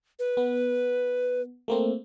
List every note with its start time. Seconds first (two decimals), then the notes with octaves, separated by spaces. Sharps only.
0.19 B4
0.37 B3
1.68 A3 A#3 C4